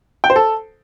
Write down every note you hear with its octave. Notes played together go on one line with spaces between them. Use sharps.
G5
C5
A4